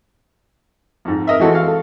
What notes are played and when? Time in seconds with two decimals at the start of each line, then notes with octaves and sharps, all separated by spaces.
1.05 F2 G#2
1.27 A#4 D#5 E5
1.40 E3 G#3 C4 F#4 A4
1.55 F5
1.67 A4